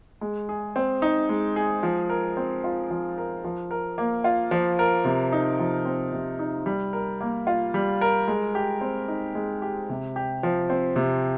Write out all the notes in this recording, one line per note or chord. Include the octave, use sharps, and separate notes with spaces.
G#3
G#4
C4
D#4
G#3
G#4
F3
A#4
C4
F4
F3
A#4
F3
A#4
A#3
F4
F3
A#4
C3
D#4
F3
C4
C3
D#4
G3
A#4
A#3
F4
G3
A#4
G#3
G4
C4
D#4
G#3
G4
C3
G4
F3
C4
C3